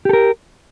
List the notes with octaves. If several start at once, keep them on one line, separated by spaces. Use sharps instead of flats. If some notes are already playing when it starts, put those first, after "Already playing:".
G4 A4 A#4